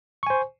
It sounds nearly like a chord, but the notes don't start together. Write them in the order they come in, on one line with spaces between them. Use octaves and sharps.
C#6 G#5 C5